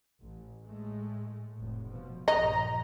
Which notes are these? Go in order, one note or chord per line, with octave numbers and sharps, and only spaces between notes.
A1
A2 G#3 A3
F1 A2
B2 F3
A#1 G2 F3 D#5 A#5